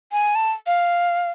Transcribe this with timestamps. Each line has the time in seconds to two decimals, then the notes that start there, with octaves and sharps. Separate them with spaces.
0.12 G#5
0.35 A5
0.67 F5